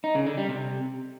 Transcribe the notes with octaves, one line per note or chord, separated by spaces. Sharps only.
D#4
C#3
D3
G3
C3